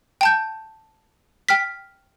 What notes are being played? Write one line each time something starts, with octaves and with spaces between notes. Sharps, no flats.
G5 A5 G6
G5 F6 B6